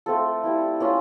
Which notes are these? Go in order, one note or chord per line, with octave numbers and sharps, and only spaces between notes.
A3 C4 F4 A4
G3 C4 E4
A#3 C#4 F4